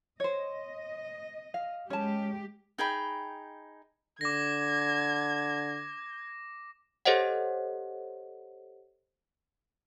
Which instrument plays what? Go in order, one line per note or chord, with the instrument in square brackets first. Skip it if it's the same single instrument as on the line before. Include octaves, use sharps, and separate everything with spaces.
[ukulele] C5 C#5 [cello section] D#5
[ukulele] F5
[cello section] G#3 G4 [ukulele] C#4 A5
[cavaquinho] D#4 G#4 G5 B5
[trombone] D3 [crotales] D6 A#6 [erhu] G#6
[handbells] G4 A4 C5 C#5 D#5 F#5